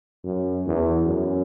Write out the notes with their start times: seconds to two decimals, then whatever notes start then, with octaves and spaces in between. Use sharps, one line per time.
0.24 F#2
0.66 E2
1.06 F#2